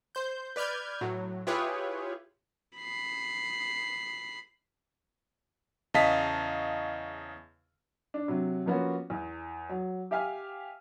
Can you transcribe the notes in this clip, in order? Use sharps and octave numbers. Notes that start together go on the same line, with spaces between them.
C5 G6
B4 D5 F6 G6 G#6
A2 F#3
E4 F4 G4 G#4 B4 C#5
B5 C7
E2 C#3 D#5 F5 A5 B6
D4
C3 F#3
F3 A#3 B3 C#4 F#4
E2
F#3
G4 E5 F5 G#5 F6